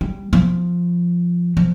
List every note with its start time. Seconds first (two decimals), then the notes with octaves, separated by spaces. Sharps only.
0.01 G3
0.33 F3
1.57 F3